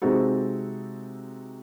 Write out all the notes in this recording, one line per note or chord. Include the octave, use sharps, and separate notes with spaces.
C3 G#3 C4 D#4 F#4 A4